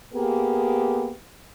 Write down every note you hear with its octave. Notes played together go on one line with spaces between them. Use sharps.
A#3 B3 G4 G#4